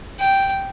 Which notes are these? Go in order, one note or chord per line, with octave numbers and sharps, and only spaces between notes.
G5